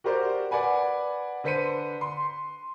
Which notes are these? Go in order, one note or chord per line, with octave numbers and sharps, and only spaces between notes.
F#4 G4 A#4 C5 D5
B4 D5 F#5 G#5 B5
D3 B4 C5 B6 C#7 D#7
C6